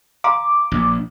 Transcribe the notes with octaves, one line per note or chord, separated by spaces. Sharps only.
F5 A#5 C6 D6
A#1